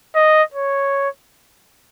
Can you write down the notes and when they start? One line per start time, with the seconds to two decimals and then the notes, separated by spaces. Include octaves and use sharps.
0.16 D#5
0.54 C#5